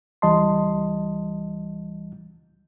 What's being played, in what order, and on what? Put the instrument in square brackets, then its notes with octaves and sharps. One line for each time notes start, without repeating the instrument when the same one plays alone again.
[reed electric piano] C#2 E3 G3 D#5 A5 C6